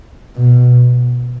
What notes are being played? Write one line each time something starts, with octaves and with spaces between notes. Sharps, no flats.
B2